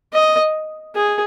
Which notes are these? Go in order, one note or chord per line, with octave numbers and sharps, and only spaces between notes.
D#5
G#4